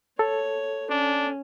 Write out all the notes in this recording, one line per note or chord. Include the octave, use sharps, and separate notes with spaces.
A4 C#5
C#4 D4